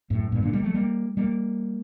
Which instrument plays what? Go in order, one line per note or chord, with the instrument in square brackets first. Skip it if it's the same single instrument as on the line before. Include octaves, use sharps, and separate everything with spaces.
[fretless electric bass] F#2 A2
G2 A#2
A#2 D3
G3 A#3
F#3 A3
G3 A#3
G3 A#3